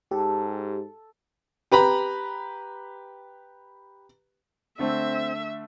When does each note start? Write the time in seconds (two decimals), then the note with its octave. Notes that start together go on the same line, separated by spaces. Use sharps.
0.11 G#2 G4 A4
1.72 G4 B4 A#5 B5
4.79 D3 A3 C4 E5